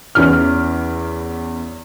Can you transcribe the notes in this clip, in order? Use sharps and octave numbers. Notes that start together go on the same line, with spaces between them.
E2 E3 C#4 F6